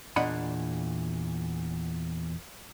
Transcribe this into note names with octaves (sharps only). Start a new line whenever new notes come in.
E2 A#2 D4 D#5 F#5 B5